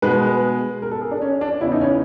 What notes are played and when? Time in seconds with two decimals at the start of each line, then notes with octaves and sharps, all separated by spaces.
0.02 B2 G#3 B3 B4
0.82 A#4
0.91 A4
1.01 G#4
1.11 D4
1.22 C#4
1.41 D4
1.61 E2 C#3 E3 E4
1.72 D#4
1.81 C#4